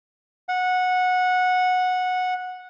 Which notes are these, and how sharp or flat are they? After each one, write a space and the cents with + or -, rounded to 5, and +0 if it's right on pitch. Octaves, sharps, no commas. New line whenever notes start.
F#5 -15